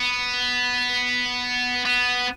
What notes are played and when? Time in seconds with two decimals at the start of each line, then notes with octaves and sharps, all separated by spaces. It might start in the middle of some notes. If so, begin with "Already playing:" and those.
Already playing: B3
1.86 B3